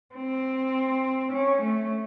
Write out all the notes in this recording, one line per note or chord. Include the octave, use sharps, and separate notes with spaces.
C4
C#4
A3